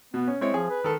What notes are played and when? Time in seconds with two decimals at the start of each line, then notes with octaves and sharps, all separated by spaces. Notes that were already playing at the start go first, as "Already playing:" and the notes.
0.14 B2 B3
0.28 C#4
0.41 G#3 C4 E4 C#5
0.54 F3 G#4
0.70 B4
0.84 D#3 A4